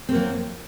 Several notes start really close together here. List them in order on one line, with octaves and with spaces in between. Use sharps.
C4 A#3 F#3